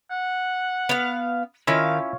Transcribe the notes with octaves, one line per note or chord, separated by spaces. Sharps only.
F#5
B3 F5
D#3 C#4 E4 F4 C#5 F5